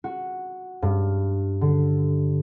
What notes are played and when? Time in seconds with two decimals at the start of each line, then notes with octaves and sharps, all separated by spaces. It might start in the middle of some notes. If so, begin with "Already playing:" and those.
0.04 F#4
0.82 G2
1.61 D3